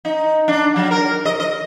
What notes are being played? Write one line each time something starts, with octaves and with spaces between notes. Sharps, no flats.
D#4
D4
F#3
A#4
D#5
D#5